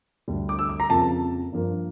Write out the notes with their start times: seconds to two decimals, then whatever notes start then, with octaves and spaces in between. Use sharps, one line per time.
0.28 D2 D3 G3
0.49 D6
0.59 E6
0.69 D6
0.80 A#5
0.90 F2 C#3 F3 A#3 A5
1.53 G2 F3 A#3